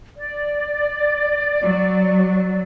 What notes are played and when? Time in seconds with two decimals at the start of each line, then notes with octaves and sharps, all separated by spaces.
0.17 D5
1.62 F#3